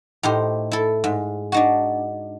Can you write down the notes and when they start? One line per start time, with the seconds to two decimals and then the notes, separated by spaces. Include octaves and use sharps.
0.23 A2 D#4 G4 C5
0.72 E4 A4
1.04 G#2
1.52 D4 D#4 F#4